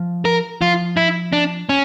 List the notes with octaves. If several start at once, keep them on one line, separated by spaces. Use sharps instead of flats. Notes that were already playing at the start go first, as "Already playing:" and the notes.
Already playing: F3
A#4
F3 F4
E4
D4
C#4